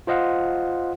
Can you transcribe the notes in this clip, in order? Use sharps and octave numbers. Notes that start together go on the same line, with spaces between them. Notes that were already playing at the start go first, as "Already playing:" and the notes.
F4 C5 D#5 F5 F#5